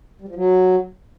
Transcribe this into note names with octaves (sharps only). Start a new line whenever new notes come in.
G3
F3
F#3